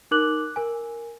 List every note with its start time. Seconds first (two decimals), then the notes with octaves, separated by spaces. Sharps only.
0.11 D#4 A#4 D6 F#6 F#7
0.56 A#4 G#5